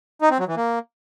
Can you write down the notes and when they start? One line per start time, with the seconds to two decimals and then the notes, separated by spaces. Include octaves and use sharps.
0.22 D#4
0.30 C4
0.39 F#3
0.48 E3
0.57 A#3